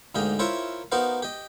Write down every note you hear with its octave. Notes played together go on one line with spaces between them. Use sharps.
D2 G#2 A#3 G4 D#5
E4 F4 A#4 C5 C#5 E5
B3 D#4 F#4 A#4 C5 F5
G4 D#5